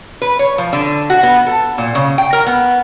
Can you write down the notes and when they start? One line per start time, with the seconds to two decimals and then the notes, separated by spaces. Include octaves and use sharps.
0.22 B4
0.39 C#5
0.58 F3
0.73 D3
1.10 F#4
1.23 B3
1.46 A4
1.78 A#2
1.95 C#3
2.18 G5
2.33 A#4
2.47 B3